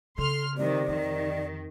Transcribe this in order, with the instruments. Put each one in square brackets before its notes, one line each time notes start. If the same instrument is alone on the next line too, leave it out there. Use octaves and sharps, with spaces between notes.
[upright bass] C#3 [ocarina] A4 [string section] C6 F6
[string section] C3 D#3 [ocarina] D5
[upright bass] F2 [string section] D#3